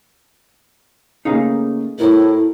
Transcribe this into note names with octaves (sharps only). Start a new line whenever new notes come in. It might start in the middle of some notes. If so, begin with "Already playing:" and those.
C#3 A3 A#3 D#4 G#4 F5
A2 E4 F#4 A#4 C5